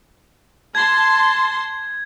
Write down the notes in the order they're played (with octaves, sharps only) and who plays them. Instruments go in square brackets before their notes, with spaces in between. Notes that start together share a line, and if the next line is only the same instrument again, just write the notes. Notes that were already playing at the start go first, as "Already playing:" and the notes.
[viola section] A5 C6 [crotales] G#6